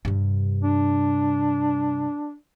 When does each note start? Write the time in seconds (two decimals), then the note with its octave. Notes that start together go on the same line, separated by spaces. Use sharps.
0.05 G2 C3
0.63 D4